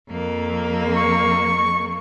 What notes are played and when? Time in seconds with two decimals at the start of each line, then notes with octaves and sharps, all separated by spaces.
0.10 F2 A#3
0.96 C#6